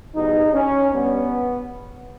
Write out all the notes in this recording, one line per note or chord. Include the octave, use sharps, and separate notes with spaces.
E2 B2 G3 D#4
C#4
G2 G3 B3